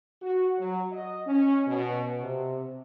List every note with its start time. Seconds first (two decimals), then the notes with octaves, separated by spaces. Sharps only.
0.22 F#4
0.59 F#3
0.93 D#5
1.26 C#4
1.67 B2
2.21 C3